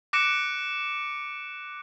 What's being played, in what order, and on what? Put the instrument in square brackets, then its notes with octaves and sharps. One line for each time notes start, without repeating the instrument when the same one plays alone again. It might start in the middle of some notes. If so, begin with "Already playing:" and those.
[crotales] D6 F#6 A#6 C#7 D7 E7